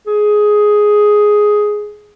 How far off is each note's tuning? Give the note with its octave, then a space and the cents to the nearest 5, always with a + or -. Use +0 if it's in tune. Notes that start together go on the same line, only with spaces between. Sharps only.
G#4 +5